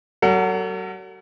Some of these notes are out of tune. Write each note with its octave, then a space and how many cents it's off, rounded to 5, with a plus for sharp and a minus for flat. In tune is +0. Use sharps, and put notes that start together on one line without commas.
F#3 +35 A4 +45 F#5 +0